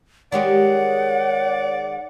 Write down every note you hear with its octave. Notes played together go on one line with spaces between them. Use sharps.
D#3 G#3 G4 C#5 D5 F#5